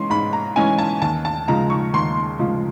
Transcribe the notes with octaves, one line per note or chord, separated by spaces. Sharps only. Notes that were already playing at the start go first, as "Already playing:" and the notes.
Already playing: E3 G#3 C#4 C6
G#2 B5
A#5
E3 G#3 C#4 G#5
A5
D#2 A5
A5
C#3 F3 G#3 A#5
C#6
D#2 C6
C#3 F3 G#3